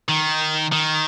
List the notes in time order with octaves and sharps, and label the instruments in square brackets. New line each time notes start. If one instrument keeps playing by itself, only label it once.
[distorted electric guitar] D#3
D#3